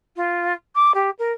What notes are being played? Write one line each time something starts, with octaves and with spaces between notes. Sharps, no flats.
F4
D6
G4
A#4